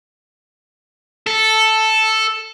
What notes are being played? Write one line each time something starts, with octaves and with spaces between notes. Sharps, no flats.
A4